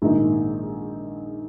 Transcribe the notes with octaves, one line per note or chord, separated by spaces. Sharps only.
A#1 G#2 D#3 A#3 D#4